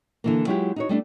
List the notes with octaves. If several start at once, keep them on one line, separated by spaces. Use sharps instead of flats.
D3 E3 A#3
F#3 G#3 E4 F4 G4
D#4 F#4 C#5
G3 A3 C#4 D4